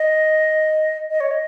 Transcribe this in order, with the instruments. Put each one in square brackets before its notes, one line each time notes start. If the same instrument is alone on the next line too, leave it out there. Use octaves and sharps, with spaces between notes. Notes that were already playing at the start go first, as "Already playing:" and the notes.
Already playing: [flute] D#5
D#5
C#5
D#5